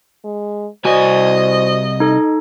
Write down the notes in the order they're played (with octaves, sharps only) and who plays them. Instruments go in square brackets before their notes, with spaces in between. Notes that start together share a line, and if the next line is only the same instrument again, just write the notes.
[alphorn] G#3
[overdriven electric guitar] C2 G#5 [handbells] F#4 D5 [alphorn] C5 [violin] D#5
[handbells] D#4 A4